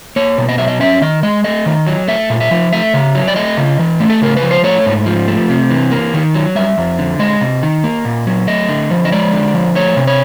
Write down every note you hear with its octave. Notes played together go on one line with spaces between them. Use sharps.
A#3 C#5
B2
D#5
F#3 E5
D#5
C#4 E5
D#3 D#5
G#3 D#5
A3 D#5
D#3
F#3
A3 E5
A#2
E5
F3
A3 E5
C#3
F#3
D5
A3 D#5
C#3
E3
A3
A4
C#3 A#4
B4
F3
C5
A3 C#5
G#2
F3
A3
C3
E3
A#3
D#3
F#3
G3 E5
F2
D3
G#3 D#5
C3
D#3
A#3
A#2
F#3
A3 D#5
D3
F3
D#5
G#3 D5
D3
F3
A3 C#5
C3
C#5